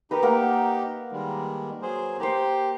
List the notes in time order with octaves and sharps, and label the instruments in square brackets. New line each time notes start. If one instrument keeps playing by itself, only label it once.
[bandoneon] D#4 G4 [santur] A#4 B4
[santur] A#3 A#4 F#5
[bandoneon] D#3 G3 G#3
F#3 G#4 C5
[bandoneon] G4 [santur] A#4 C5